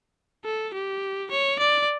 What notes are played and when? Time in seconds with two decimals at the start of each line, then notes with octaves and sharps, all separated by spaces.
0.45 A4
0.74 G4
1.31 C#5
1.59 D5